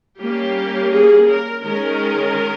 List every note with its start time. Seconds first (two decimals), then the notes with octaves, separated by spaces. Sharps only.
0.19 G3 A#3 C#4 G4
0.91 G#4
1.27 A#4
1.62 D#3 G#3 C#4 A#4